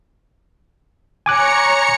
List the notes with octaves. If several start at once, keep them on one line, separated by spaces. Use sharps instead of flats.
C#5 G#5 A#5 D6 F#6 C#7